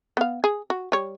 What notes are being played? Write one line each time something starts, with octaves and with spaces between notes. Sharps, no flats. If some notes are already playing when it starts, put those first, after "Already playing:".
B3 F5
G#4
F#4
G3 C#5